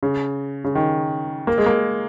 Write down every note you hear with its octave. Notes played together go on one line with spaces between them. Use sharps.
C#3
C#3
D#3
A#3
G#3
A#3